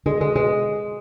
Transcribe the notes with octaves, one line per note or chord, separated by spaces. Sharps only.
D3 G#3
D3 G#3
B2 G#3